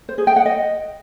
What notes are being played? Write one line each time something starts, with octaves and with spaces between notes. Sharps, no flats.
C5
G#4
G5
F#5
D#5